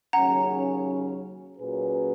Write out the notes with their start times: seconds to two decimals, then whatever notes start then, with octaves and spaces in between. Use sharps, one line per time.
0.13 D#2 C#3 F#3 C#4 F#5 A#5
1.58 A#2 F#3 C#4 G#4 B4